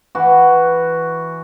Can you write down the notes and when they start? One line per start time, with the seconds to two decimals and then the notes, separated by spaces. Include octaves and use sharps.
0.15 E3 F#4